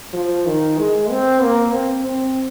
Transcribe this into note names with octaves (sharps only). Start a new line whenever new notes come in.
F3
D#3
G#3
C4
A#3
C4
C4